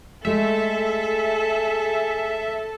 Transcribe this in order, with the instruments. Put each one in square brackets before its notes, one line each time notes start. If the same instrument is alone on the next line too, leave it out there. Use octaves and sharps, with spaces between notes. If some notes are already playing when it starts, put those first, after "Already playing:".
[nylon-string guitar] G#3 A3 [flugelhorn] G#4 [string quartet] A4 [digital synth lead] E5